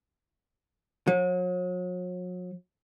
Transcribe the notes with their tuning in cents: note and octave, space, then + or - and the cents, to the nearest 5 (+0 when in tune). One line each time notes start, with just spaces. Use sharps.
F#3 -40